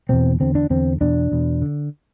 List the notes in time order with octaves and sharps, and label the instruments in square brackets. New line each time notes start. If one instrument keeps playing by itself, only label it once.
[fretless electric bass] E2 B2 C4
E2 D3 C4
D4
E2 D3 C4
E2 B2 D4
E2 B2
D3